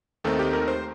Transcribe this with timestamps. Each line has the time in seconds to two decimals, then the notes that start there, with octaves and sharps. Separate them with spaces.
0.24 D#2 D#3 A3 C4 D#4 A4
0.39 G4
0.53 A#4
0.68 C5